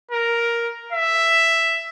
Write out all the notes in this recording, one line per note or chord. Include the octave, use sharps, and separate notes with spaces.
A#4
E5